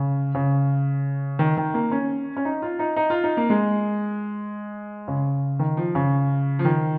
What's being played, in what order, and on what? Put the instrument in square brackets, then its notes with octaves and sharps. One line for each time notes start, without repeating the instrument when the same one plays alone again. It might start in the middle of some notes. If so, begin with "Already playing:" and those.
Already playing: [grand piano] C#3
C#3
D#3
D#3
A#3
C#4
C#4
D#4
F4
D#4
D#4
F4
D#4
A#3
G#3
C#3
D#3
F3
C#3
F3
D#3